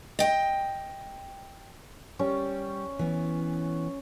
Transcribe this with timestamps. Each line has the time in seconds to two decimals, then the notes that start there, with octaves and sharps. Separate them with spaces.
0.19 D#5 G5
2.19 G3 C#4
2.99 E3 B3